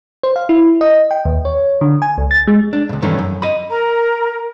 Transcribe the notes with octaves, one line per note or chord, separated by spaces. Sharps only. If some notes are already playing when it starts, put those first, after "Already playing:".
C5
F5
E4
D#5
G5
D#2
C#5
D3
G#5
C#2
A6
G#3
D4
C#2 G2
G2 D#3 E3 A3 C#4
F#2
D#5 B5
A#4 A#5